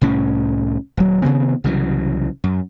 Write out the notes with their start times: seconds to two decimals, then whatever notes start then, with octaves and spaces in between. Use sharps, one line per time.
0.01 C2 A2 C#4
0.97 D#1 F#3
1.22 C3 D#3 B3 C4
1.64 C2 C#3 E3 F#3
2.44 F#2